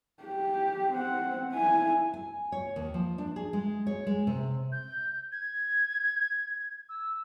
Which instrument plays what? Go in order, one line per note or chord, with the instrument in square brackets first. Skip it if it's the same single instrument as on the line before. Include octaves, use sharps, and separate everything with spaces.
[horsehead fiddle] G4
C4 F#5
E4 G#5
[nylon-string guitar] G#5
C#5
D#2
F3
D4
G#4
G#3
C#5
G#3
C3
[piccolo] G6
G#6
E6